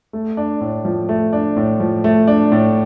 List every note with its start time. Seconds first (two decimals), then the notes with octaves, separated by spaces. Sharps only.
0.13 A3
0.37 D4
0.61 A2
0.85 F3
1.09 A3
1.33 D4
1.57 A2
1.80 F3
2.04 A3
2.27 D4
2.52 A2